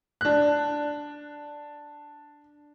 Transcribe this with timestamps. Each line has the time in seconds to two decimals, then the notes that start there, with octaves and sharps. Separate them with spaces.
0.21 D4 F#6